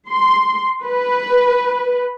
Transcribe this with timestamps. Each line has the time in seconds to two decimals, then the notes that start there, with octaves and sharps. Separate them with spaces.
0.10 C6
0.86 B4